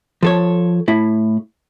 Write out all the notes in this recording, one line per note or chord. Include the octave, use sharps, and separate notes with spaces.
F3 A4 C#5
A2 E4